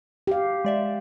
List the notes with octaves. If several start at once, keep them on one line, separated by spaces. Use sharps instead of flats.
G4 F5
G#3 D5 E5